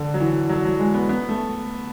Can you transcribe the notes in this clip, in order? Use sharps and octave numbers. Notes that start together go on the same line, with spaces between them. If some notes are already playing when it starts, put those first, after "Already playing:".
Already playing: D3
F#3
E3
F#3
F#3
G#3
B3
B3
A3